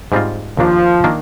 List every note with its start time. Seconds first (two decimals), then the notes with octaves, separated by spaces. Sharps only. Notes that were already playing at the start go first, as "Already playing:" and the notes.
0.12 G#2 G3 C4 F4
0.57 D#2 D#3 F3 A#3 D4
1.04 D#3 A#3 D4